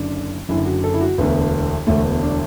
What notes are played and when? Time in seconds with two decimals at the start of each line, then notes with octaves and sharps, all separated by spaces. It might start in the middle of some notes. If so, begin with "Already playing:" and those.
Already playing: F#1 F#2 D3 D4
0.49 F#1 F#2 D3 E4
0.66 F#4
0.84 A4
0.94 E4
1.01 F#4
1.18 E1 D2 D3 B3
1.87 E1 D2 D3 A3
2.05 B3
2.22 D4